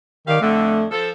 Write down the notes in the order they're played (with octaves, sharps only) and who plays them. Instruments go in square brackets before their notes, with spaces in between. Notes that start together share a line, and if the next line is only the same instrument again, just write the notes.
[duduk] D#3 [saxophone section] G3 D5 F5
[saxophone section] F2 D3 [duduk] A3
[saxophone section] F3 A4